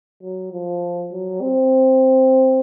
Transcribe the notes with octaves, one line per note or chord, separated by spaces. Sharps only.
F#3
F3
F#3
C4